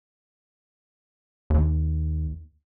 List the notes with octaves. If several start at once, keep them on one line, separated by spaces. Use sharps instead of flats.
D#2